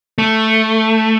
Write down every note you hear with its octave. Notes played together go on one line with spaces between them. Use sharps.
A3